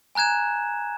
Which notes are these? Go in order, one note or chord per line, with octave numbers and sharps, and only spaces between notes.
G#5 A#5 F#6 G#6 E7